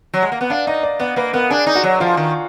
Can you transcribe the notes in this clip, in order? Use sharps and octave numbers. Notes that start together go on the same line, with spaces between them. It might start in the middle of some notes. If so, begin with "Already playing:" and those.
F#3
G#3
A#3
B3
D4 F5
D#4 D#5
D5
B3 D5
A#3 B4
B3 A#4
D4 G#4
D#4
F#4
F#3
F3 F4
D#3